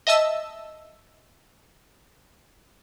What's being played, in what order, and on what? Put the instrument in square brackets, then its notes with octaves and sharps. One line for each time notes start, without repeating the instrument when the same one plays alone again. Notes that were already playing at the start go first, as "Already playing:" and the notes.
[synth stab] D#5 E5 A5 E6